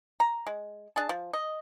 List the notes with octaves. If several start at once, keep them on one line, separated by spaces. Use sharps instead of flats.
A#5
G#3
D4 G#4 A5
F3
D#5